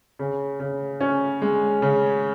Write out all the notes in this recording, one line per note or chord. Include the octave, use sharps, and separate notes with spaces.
C#3
C#3
C#4
G#3
C#3